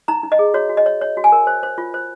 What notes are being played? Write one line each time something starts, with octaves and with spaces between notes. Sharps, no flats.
D#4 A#5
D#4
D#5
G#4
F#4 C#5
F#4
D#5
C#5
C#5
F#4
G#5
A#4
C5
C5
F4
C5